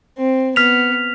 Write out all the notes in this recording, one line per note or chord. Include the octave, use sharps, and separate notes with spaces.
C4
B3 F6 B6 F7